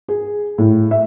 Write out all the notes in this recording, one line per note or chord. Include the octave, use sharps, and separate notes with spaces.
G#4
A2
E5